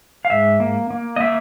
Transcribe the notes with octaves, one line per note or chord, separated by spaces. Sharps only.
F5
G#2 E5
A#3
A#3
D#5
A#3 E5